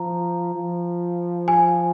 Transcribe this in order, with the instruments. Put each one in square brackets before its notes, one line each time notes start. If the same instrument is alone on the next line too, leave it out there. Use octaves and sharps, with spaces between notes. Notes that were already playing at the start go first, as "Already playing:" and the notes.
Already playing: [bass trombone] F3 [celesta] A#5
[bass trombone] F3
[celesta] G#5